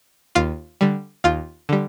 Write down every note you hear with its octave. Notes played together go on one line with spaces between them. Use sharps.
D#2 F4 F5
D3 G3
D#2 F4 F5
D3 G3